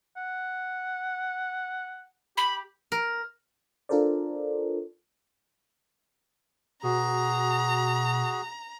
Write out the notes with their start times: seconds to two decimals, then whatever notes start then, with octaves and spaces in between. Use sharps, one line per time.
0.17 F#5
2.37 G4 B5
2.92 A#4
3.89 D4 F4 A4 A#4 C5 D5
6.83 B2 F#4 G#4 A#5